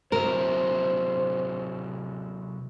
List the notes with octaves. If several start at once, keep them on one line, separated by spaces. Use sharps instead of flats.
C3 F#3 E4 A#4 C5